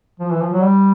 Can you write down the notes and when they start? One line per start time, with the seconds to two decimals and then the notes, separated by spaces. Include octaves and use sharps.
0.20 F3
0.31 E3
0.42 F3
0.53 F#3
0.63 G3